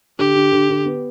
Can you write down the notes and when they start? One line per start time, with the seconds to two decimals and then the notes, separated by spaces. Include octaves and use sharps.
0.19 D3 G4
0.35 D3
0.52 D3
0.70 D3
0.86 B3